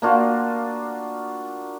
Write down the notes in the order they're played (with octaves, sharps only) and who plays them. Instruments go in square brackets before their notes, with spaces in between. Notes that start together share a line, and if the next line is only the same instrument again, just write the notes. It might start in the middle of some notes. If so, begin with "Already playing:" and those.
[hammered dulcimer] A#3 D4 F4 F#4